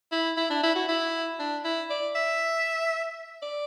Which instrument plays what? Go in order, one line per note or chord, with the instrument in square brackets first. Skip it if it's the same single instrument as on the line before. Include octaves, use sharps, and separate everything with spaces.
[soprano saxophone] E4
E4
D4
E4
F#4
E4
D4
E4
D5
E5
D5